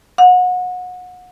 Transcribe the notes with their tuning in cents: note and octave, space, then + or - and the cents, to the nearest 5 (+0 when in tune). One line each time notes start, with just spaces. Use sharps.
F#5 -30